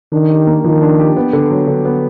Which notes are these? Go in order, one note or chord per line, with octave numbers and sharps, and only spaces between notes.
D#3 D4
G4
A#3
D#3 F3
D4
G4
B3
D3
F#3
D3
B3